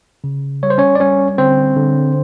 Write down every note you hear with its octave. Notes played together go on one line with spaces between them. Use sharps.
C#3
G3 C#5
C5
C#4 C#5
D5
G3 C#4 C#5
D3 C4 C5
D3